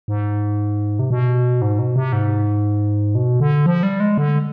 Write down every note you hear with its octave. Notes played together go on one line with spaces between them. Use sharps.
G#2
C3
B2
G#2
B2
C3
G#2
B2
D3
F3
G3
G#3
D3